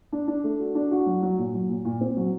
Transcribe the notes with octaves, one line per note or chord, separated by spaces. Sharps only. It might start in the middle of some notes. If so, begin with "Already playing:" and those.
D4
D4
A3
F#4
D4
F#4
F#3
F#3
A#2
F#3
A#2
A#2
C4
F#3